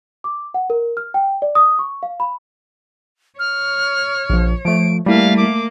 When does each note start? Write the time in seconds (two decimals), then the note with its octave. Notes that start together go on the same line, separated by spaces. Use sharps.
0.24 D6
0.54 F#5
0.70 A#4
0.97 F6
1.14 G5
1.42 D5
1.55 D#6
1.79 C#6
2.03 F5
2.20 B5
3.39 C#5 F6
4.30 A#1 F3
4.65 F3 A3 D7
5.06 G3 A3 A#3 E4 F5
5.37 A#3 D6